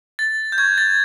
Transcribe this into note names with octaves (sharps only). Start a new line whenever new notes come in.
A6
G6
C#6 F#6 G#6
A6